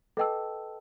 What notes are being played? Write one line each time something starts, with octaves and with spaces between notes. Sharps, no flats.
A4 B4 D#5 G5 A5 E6